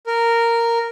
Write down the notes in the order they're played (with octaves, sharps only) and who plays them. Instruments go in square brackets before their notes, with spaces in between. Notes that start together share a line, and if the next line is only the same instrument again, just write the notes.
[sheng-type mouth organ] A#4